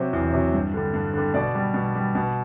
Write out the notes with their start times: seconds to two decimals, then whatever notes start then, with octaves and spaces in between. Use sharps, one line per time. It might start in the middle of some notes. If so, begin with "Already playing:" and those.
Already playing: C3 F#3 C5
0.13 E2
0.33 C3 F#3
0.53 G2
0.74 D3 G3
0.94 G2
1.14 D3 G3
1.34 B2 D5
1.55 G3
1.74 B2
1.95 G3
2.15 B2